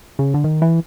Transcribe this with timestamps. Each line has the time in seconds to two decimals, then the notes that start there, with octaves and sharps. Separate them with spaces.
0.19 C#3
0.34 D3
0.44 D#3
0.62 E3